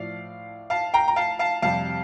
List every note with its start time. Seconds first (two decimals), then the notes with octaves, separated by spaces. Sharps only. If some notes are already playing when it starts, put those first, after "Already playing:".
Already playing: A2 F3 D5 F5
0.70 F5 A5
0.94 G5 A#5
1.08 A#5
1.16 F5 A5
1.39 F5 A5
1.62 F2 C3 G3 F5 A5